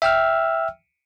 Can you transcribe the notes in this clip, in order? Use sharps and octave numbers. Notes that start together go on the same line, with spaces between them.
E5 G5 E6 F6